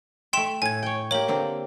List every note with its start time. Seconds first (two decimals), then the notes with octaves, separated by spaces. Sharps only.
0.33 A3 E5 G5 C6 E7
0.62 A2 G#5 G#6
0.83 C#5 G5
1.11 A#3 G4 C#5 F#7
1.28 D3 A#3 C4